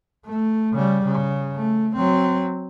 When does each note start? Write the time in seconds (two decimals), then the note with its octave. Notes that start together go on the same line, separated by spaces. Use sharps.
0.25 A3
0.73 C#3 G3
1.04 C#3
1.56 A3
1.96 F#3 C4